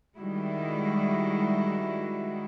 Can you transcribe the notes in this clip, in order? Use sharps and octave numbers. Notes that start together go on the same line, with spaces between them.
D#3 G3 G#3 E4 F#4